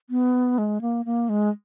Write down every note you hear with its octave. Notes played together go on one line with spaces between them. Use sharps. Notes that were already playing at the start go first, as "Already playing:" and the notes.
B3
G#3
A#3
A#3
G#3